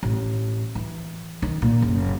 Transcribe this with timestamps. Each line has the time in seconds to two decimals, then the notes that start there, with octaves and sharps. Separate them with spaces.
0.03 A1
0.75 E3
1.42 D#3
1.62 A#2
1.82 F#1